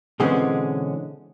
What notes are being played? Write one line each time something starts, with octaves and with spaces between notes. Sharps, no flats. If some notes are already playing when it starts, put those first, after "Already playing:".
B2 D3 E3 G#3 C4 C#4